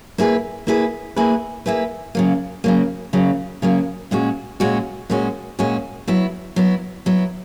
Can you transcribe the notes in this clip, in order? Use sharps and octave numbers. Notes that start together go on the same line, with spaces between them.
A#3 E4 G#4 B4
A#3 E4 G#4 B4
A#3 E4 G#4 B4
A#3 E4 G#4 B4
C#3 F#3 A#3
C#3 F#3 A#3
C#3 F#3 A#3
C#3 F#3 A#3
A#2 G#3 C#4 F#4
A#2 G#3 C#4 F#4
A#2 G#3 C#4 F#4
A#2 G#3 C#4 F#4
F#3 B3 E4
F#3 B3 E4
F#3 B3 E4